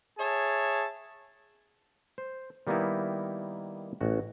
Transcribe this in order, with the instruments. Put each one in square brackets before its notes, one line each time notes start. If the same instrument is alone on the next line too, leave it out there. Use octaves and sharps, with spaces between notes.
[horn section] G#4 C#5 E5 A5
[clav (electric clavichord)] C5
D#3 G3 A#3 B3 D#4 E4
A1 F#4